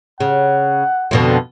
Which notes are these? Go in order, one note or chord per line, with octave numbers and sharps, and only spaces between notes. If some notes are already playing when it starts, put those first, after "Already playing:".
C#3 F#5
F2 B2 D3